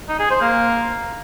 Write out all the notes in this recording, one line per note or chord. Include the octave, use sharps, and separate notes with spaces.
D#4
G#4
C5
A#3